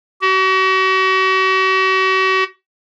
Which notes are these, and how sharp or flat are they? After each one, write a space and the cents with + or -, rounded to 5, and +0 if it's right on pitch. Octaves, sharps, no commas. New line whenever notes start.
F#4 +40